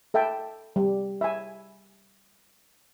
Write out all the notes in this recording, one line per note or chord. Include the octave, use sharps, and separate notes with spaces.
A4 E5 G5 A5
G3
E5 G#5